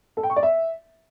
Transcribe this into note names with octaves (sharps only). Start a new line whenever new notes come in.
A4
G5
C#6
D5
E5